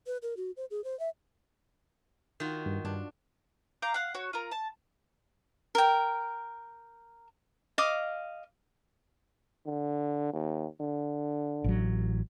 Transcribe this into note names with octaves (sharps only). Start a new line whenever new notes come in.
B4
A#4
F#4
C5
G#4
C5
E5
D#3 F4 F#4
G2
G2 D4
F5 A#5 D6 G6
F5 F#5
F#4 C#5
F4 A#4
A5
A#4 G5
D#5 F5 D6
D3
D#2
D3
A1 F#3